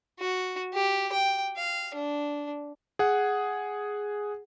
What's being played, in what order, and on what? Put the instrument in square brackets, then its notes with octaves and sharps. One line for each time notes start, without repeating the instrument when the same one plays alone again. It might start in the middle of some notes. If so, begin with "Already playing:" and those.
[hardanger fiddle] F#4
G4
G5
F5
D4
[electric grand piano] G#4 F#5